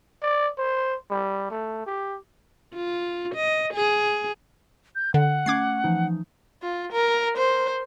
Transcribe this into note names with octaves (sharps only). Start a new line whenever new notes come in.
D5
C5
G3
A3
G4
F4
D#5
G#4
G6
D3 F#5
A3 C#4 D6 G#6 C7
E3 F3 D#4
F4
A#4
C5